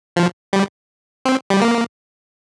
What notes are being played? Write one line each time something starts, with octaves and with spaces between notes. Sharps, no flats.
F3
G3
C4
G3
A#3